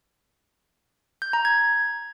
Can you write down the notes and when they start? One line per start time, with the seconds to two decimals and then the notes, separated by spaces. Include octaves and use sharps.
1.22 G6
1.33 A#5
1.45 G#6